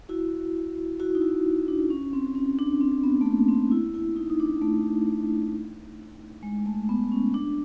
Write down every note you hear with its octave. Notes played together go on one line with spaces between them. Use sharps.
E4 F#4
E4 F#4
D#4
E4
D4
C#4
C4
C#4
D4
C4
B3
A3
A#3
C4
E4
E4
D#4
D#4
D4
A3
G#3
A3
B3
C#4
D4